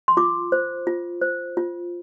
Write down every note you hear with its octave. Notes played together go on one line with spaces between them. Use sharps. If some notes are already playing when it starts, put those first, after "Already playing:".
C6
F4 D6
C5
F4
C5
F4